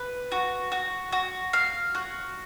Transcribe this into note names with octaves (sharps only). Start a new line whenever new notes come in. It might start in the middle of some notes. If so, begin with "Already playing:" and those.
Already playing: B4
F#4
F#4
F#4
F5
F#4